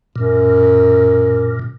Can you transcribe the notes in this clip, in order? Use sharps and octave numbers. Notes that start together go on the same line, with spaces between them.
F#2 A#2